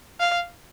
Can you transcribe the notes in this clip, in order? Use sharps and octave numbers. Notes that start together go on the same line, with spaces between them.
F5